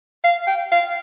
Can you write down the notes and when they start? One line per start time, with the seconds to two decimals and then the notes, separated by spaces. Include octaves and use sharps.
0.24 F5
0.47 G5
0.72 F5